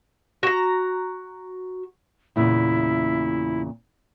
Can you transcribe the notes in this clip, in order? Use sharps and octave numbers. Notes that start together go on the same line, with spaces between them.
F#4 A#5
E2 A#2 C#3 E4